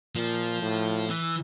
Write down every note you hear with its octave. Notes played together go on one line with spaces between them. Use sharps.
A#2 F3
A2
E3